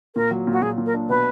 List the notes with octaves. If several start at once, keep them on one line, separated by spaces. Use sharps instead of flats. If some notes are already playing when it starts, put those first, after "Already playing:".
A#2 A#4
F#3
A#2 F#4
A#2 G#4
A#2
A#4
D4
B2 B4